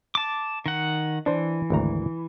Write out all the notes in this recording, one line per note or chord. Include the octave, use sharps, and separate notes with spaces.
A5 D6
D#3 F#5
E3 D4 C5
G#1 D2 A#5